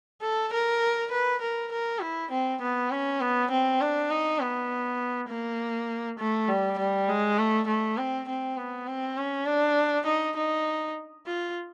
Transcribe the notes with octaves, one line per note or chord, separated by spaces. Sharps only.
A4
A#4
B4
A#4
A#4
E4
C4
B3
C#4
B3
C4
D4
D#4
B3
A#3
A3
G3
G3
G#3
A3
A3
C4
C4
B3
C4
C#4
D4
D#4
D#4
F4